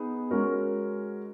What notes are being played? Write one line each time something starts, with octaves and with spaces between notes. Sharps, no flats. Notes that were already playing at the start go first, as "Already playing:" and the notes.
Already playing: B3 D#4 G#4
G#3 C#4 F#4 A#4